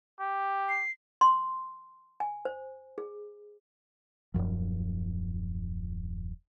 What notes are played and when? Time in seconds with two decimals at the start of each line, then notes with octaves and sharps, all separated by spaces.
0.19 G4
0.69 C7
1.21 C6
2.20 G#5
2.45 C5
2.98 G#4
4.34 D#1 A1 F#2 F3